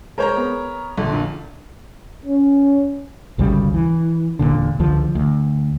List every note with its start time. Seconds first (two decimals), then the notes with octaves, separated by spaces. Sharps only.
0.18 G#3 A#4 C5 C#5 A#5
0.36 B3 G#4
0.98 A#1 D3
1.13 A#2
2.26 C#4
3.38 G#1 D2 C#3 G3
3.74 E3
4.39 E1 B1 A#2 D3
4.79 C#2 D3 F3
5.15 D2